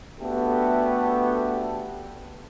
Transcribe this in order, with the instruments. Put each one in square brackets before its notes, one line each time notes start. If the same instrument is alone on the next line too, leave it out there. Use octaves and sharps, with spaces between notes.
[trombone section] A3 B3 D4 F#4 G4 A4